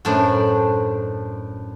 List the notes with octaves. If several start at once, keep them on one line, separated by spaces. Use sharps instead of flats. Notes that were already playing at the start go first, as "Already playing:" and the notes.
F#2 A2 D4 C5 D5